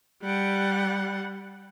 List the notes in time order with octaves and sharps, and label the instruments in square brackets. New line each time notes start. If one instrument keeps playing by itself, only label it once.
[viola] G3 F#5